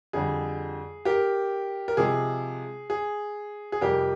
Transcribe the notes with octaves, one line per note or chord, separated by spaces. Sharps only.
F2 D3 G3 G#4
G4 A#4
A#4
C3 F3 G#3 G#4
G#4
G#4
F2 C3 G3 G4 A#4